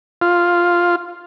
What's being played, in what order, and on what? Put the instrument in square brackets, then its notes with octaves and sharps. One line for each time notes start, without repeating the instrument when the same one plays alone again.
[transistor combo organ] F4